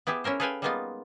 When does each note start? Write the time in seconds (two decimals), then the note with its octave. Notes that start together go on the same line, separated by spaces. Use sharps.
0.07 B3 E4 G4 G#4
0.24 C#4 E4 A#4 C5
0.40 G#4 A4 B4 F5 G5 G#5
0.62 G3 G#3 A#3 B3 D#4 F4